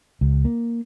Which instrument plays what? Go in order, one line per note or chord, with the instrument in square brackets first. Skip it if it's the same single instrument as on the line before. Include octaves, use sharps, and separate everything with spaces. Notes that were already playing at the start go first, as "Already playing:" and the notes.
[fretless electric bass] C#2
A#3